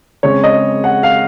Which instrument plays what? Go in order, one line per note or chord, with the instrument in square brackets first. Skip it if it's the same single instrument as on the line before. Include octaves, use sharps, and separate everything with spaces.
[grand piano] C#3 G#3 C4 C#5
D#5
F#5
F5